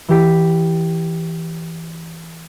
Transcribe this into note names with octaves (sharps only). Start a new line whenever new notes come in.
E3 G4 B6